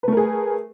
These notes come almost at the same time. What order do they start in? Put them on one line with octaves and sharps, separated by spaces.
B4 A3 A#4 G#4